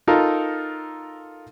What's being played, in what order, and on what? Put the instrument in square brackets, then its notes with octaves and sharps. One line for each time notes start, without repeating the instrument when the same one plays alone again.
[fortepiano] D#4 F4 A4 A#4